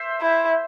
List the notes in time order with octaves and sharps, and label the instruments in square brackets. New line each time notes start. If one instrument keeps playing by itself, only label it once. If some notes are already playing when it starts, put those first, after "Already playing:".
Already playing: [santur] C5 E5
[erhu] E4